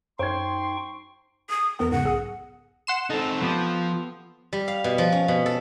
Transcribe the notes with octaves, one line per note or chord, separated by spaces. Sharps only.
F#2 D#4 C5 G5 C6 C#6 G#6
D#6
E2 B3 A#4 F#5
G#2 C#3 F#5
B1 G#4 D#6
F#5 C6 E7
C4 D#4 A4
F3 B3 G4 D#6
G3
F5
B2
F3
C#4
B2
A4